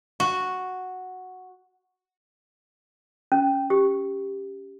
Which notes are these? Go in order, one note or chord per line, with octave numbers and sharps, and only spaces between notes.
F#4
C#4
G4